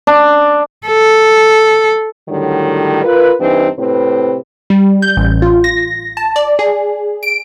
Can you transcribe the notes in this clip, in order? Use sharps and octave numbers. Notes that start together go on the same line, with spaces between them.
D4
A4
A2 D3 D#3 F#3 G3
F4 A#4 B4
G2 E3 C4 D4 D#4
A2 C3 C4 B4
G3
G6
A1
F4
A#6
A5
D5
G#4
D7